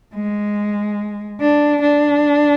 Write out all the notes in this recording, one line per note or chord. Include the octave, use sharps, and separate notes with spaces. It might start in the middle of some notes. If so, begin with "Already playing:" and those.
G#3
D4
D4